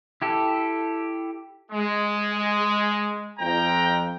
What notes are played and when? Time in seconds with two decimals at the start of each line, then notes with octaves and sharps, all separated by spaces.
0.22 E4 G4 A4
1.72 G#3
3.39 F2 G5 A#5